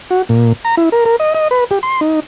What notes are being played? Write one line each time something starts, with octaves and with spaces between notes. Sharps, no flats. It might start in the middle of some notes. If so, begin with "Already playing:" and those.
F#4
A#2
A#5
E4
A#4
A#4
D#5
D#5
B4
G4
C6
D#4